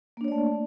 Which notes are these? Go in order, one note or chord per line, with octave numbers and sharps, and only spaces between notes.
A3 A#3 D4 C#5 D5